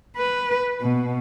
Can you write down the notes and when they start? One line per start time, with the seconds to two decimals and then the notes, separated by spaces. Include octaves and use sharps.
0.16 B4
0.81 B2